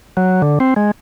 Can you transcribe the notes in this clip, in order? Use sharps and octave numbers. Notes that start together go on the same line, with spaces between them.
F#3
D3
C4
G#3